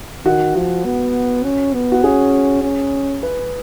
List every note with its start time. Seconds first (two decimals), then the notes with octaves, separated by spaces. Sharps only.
0.25 D#3 F#4
0.55 F3 F#4
0.85 B3
1.44 C#4
1.74 B3
1.92 F#4
2.03 C#4 G#4
2.63 C#4
3.23 B4